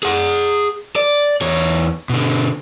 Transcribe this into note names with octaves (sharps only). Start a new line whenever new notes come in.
G#4 F#5
D5
E2 C#5
B2 D3